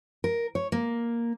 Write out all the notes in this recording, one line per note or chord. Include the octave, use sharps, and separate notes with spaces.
A#4
C#5
A#3